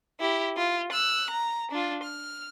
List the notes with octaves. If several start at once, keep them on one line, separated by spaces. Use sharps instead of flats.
E4 G4
F4
E6 F#6
A#5
D4 F4
F6